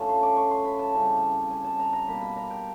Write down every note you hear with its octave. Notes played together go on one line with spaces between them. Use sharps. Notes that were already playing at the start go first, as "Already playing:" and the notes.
Already playing: D3 F3 A3 C#4 A5
C6
D6
C#6
C6
B5
A5
C#3 E3 G3 C4
G#5
A5
A#5
A#5
B2 G3 A#3 B5
B5
A#5
G5